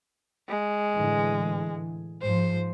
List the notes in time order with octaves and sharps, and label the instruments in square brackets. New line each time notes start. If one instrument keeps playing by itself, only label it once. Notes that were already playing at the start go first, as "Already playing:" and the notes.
[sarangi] G#3
[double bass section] A2 D3 E3
[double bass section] G#2 F3 [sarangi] C5